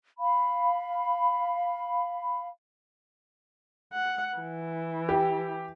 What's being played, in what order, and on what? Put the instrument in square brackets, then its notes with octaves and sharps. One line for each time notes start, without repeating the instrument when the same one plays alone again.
[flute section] F5 B5
[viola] F#5
E3
[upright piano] G4